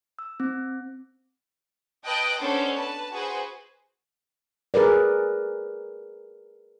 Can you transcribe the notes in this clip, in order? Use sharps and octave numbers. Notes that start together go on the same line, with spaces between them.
E6
C4
B4 D#5 G5 A5 D#6 F#6
B3 C#4 D4 A4 C5
B4 A5
F#4 G#4 B4 C5
G#4 A#4 B4 D5